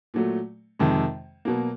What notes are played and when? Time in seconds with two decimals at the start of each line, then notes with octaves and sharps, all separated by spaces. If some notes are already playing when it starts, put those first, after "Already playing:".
0.14 A#2 F#3 A3
0.79 F2 C3 D#3 G#3
1.45 B2 F#3 A#3